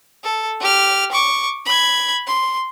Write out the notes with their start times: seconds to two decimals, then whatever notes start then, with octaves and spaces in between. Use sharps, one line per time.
0.24 A4
0.61 G4 F6
1.12 C#6 D6
1.66 B5 G#6
2.27 C6